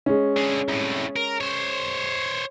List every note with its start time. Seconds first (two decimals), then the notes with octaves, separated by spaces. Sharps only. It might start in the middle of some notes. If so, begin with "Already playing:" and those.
0.06 G#3 C#4
0.37 D3 G#4
0.69 C2 A2
1.16 A#4
1.41 C5 C#5